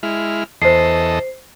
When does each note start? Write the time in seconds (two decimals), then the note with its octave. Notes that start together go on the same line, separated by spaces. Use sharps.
0.03 G#3 E4 F6
0.62 E2 A4 C5 D#5 C7